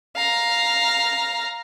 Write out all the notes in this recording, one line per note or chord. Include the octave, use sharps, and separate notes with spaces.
F5 A#5